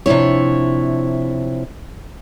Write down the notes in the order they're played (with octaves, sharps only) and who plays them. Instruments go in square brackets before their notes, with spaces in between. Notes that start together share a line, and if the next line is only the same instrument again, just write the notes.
[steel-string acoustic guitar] C3 F3 D4 E4 C#5